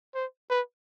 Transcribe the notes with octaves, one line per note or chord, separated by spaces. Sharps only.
C5
B4